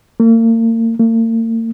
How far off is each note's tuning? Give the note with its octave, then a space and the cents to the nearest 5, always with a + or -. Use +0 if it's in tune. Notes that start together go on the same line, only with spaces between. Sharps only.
A#3 -40
A#3 -45